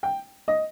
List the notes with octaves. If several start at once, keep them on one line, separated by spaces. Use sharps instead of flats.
G5
D#5